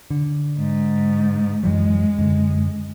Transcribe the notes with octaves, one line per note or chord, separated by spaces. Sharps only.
D3
G#2
F#2 E3 F#3 G#3
F#2 D3